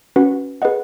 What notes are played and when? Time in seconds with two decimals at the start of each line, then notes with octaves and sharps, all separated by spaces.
0.16 C#4 F#4 B4 F#5
0.62 G#4 B4 D#5 F#5